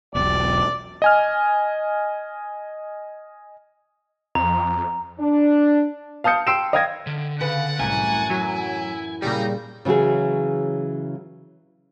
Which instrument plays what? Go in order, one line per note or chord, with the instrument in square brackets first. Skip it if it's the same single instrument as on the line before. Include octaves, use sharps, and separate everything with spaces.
[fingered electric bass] E1 B1 [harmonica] D5
[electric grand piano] D#5 G#5 F6
[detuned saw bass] F2 [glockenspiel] A#5
[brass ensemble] D4
[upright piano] F5 A5 D#6 G6 C#7
G5 C6 E6 C7 D7 E7
D#5 F5 G5 D#6 G#6 A#6
[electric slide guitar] D3
[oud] C#3 B4 [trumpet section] D5 F#5
[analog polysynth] C2 [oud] F#2 A2 E3 [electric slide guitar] G#5
[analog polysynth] F#3 [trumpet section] E4
[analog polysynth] A#2 C#3 G3 [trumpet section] C4 D#4
[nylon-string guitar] C#3 E3 F#3 F#4 G#4